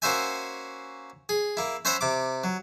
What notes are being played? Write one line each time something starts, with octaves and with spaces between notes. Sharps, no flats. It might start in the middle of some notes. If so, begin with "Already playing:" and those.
A#3 C#4 F#4 C5 E5 G#5
G#4
A#3 E4
C#4 C5 E5 F#5 A#5 B5
C3 D6
F#3